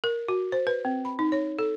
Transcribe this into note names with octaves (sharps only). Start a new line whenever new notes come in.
A#4
F#4
C5
B4
C4
B5
D#4
C#5
A4